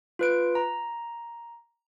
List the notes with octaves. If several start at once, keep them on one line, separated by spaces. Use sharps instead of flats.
F4 B4 D7
A#5